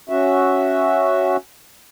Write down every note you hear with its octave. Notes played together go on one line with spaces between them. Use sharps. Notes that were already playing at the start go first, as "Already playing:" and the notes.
C#4 F#4 E5